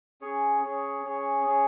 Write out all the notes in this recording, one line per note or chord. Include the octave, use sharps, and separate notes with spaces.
C#4 G#4 C#5
C#4 G#4 C#5
C#4 G#4 C#5
C#4 G#4 C#5